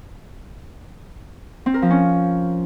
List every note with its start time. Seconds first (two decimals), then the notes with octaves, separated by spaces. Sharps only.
1.66 C4
1.74 A#4
1.82 F3
1.90 C#4